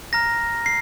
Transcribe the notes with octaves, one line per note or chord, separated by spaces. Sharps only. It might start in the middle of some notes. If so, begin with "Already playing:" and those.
A#5 F6 A#6
C7